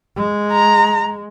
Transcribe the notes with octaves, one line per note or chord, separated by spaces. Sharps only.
G#3
A#5